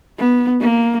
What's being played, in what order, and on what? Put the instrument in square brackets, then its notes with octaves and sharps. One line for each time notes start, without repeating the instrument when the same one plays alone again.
[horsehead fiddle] B3
A#3